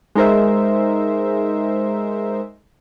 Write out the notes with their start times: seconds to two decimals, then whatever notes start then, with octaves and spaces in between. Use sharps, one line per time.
0.15 G#3 D#4 A#4 C5 E5